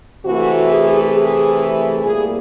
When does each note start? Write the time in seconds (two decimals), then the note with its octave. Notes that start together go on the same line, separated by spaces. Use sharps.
0.25 C3 E3 A3 F#4
0.69 G#4
1.14 G#4
2.03 A#2 G3 A#3 G#4